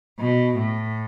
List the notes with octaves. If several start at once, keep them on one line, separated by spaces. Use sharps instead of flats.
B2
A2